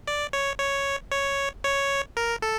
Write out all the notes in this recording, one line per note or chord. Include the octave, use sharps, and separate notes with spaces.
D5
C#5
C#5
C#5
C#5
A#4
A4